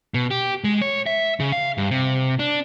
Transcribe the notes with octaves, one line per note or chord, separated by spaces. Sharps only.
B2
G4
G#3
C#5
E5
C#3
F5
G2
C3
D4